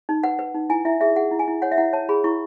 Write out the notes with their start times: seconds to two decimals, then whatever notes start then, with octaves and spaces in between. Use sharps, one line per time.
0.09 D#4
0.23 B4 F#5
0.39 B4
0.54 D#4
0.70 E4 G#5
0.85 E4 E5
1.01 G#4 E5
1.16 G#4 F#5
1.31 E4
1.39 G#5
1.48 E4
1.62 C#5 F#5
1.72 E5
1.78 E4 F#5
1.93 C#5 A5
2.09 G#4 B5
2.24 E4 C#6